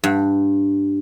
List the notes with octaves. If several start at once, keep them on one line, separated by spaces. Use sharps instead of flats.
G2